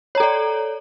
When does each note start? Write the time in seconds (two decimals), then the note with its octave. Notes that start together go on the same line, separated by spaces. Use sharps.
0.15 C#5
0.18 A#5
0.20 A4
0.23 D5